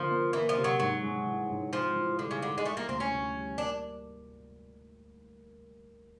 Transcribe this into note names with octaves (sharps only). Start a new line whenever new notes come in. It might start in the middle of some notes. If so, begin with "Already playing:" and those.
Already playing: D3 F3 A#3
A#3
E3 A#3
F3
C3
F#3
G#2 F#3
G#3
E3
G#2
F3 C4
E3
D3 G3
C#3
D3 E3
G#3
G3 A3
A#3
D2 C4
C#4
D2
G3
A#3 D4